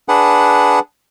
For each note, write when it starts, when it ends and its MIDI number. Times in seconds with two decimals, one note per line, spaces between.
0.09 0.79 62
0.09 0.79 68
0.09 0.79 71
0.09 0.79 78